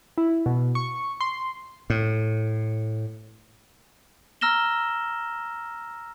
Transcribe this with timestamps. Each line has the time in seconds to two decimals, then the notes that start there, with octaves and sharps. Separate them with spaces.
0.18 E4
0.46 B2
0.75 C#6
1.21 C6
1.90 A2
4.41 A#5 E6 F6 A#6 E7 G7